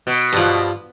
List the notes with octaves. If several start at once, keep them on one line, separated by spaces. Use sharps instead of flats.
B2
G2 F3